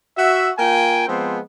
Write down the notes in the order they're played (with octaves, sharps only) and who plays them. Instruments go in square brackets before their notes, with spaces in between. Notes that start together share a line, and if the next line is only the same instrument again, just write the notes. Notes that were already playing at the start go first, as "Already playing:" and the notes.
[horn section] F#4 E5
A#3 F4 G5 G#5
F3 G#3 B3 C4